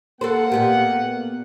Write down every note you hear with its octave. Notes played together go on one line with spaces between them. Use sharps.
A#3 A4 A#4 C5 F#5
A#2 B3 G4